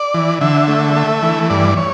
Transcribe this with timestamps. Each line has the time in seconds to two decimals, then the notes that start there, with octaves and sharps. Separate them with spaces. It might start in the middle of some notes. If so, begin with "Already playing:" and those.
Already playing: D5
0.14 E3
0.41 D3 E5
0.68 A3
0.96 A3
1.22 E3
1.50 G2 D5
1.77 C#5